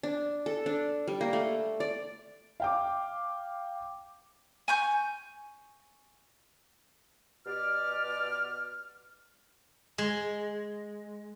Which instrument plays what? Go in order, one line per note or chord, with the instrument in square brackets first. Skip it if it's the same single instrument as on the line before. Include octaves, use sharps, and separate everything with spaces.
[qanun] D4
A4
D4
G3
A#3
A3
D5
[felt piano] F5 G5 D6
[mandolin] G#5 C#6 G6
[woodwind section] B2 G4 D5 F6
[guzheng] G#3